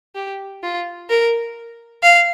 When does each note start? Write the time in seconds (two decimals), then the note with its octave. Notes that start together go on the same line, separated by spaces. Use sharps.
0.15 G4
0.63 F4
1.10 A#4
2.03 F5